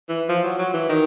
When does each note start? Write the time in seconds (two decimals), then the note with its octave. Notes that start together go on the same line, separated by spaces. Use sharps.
0.09 E3
0.29 F3
0.44 F#3
0.58 F#3
0.74 E3
0.89 D#3